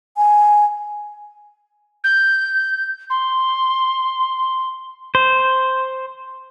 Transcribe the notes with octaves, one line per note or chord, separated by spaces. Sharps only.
G#5
G6
C6
C5